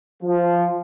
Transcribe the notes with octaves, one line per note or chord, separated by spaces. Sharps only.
F3